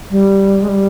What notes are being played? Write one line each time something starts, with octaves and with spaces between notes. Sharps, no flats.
G3
G#3
G3